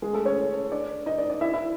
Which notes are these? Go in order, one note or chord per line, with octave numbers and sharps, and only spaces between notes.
G#3 G#4
A3 A4
C#4 C#5
D4 D5
D#4 D#5
D4 D5
D4 D5
E4 E5
E4 E5